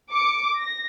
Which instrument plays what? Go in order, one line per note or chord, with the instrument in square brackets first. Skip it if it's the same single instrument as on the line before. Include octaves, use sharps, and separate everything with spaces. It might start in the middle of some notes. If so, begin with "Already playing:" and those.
[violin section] D6 C#7
A#6